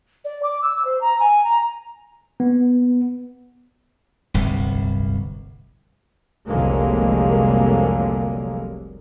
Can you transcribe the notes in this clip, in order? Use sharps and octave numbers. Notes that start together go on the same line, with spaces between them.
D5
D6
E6
C5
A#5
G#5
A#5
B3
D1 G1 C2
F1 C2 D3 F#3 G#3 A#3